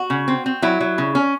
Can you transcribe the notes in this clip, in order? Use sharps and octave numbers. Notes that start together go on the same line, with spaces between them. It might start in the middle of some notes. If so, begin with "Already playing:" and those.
Already playing: F#4
C#3
C4
C4
F#3 E4
F#3
C#3
C#4